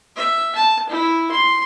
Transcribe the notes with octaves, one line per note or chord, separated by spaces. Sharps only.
E5
A5
E4
C6